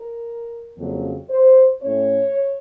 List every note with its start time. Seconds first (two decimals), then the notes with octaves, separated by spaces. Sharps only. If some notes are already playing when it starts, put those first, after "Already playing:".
Already playing: A#4
0.76 F2 C#3 F#3 A#3 C#4
1.29 C5
1.82 A2 A3 C#4 C#5